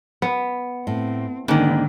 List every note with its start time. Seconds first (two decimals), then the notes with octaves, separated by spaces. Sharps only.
0.22 B3
0.87 A2 C4
1.48 G#2 D3 D#3 A#3 C#4 D#4